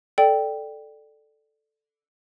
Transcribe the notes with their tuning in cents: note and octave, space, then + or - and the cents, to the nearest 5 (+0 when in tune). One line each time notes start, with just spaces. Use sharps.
A4 +0 D5 +10 G5 +0